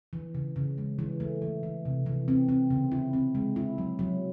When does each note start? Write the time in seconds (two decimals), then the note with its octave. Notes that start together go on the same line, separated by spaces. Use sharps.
0.13 E3
0.35 C#3
0.56 C#3
0.78 G#3
0.99 E3
1.20 A3
1.42 E3
1.63 E3
1.85 C3
2.06 E3
2.28 C4
2.49 C4
2.70 C#3
2.92 E4
3.13 C4
3.35 G#3
3.56 E4
3.78 F#3
3.99 F#3